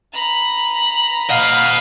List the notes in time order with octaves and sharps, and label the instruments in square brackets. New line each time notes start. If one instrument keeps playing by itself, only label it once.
[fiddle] A#5 B5
[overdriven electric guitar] D#5 F#5 [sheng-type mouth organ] F5